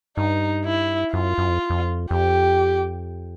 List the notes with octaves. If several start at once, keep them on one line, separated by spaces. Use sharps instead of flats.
G2 D#4
E4
F#2 F4
F#2
F2
F2
F2 G4